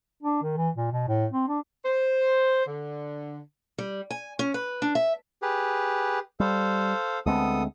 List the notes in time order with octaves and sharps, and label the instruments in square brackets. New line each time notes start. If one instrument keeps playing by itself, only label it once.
[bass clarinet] D4
D#3
E3
A#2
B2
A2
C4
D4
[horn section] C5
D3
[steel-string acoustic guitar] G3
G#5
C#4
B4
D4
E5
[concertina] G4 G#4 B4
[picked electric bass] G3 [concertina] A4 C5 F5
[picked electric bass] D2 G#3 C4 [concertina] B3 A4 D#6